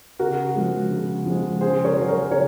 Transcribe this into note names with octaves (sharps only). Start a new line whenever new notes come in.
C#3 F#4 A#4
F3 G#3
C#3
F3 G#3
C#3 G#4 C5
A#4 C#5
F#3
A#4 C#5
C#3 A#4 C#5